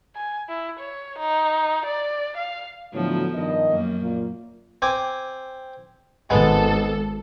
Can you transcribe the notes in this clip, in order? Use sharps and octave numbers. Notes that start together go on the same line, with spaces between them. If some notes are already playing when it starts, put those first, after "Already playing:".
G#5
E4
C#5
D#4
D5
F5
A2 D3 F3 F#3 B3
G2 D#3 D#5
F#2 A#3
A#2
C4 G#5 D6
G#1 G#3 B3 A4